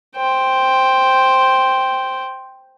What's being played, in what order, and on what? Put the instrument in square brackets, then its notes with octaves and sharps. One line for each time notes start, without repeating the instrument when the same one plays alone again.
[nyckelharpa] C5 G5